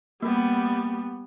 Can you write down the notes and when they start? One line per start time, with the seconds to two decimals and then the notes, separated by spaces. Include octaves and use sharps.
0.22 G3 A#3 B3